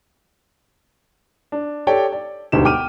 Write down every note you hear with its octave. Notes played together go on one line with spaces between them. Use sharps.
D4
G4 A4 C#5 D5 G5
D5
E1 D2 G#2 B2 G4 E7
G5 D6 F6 D#7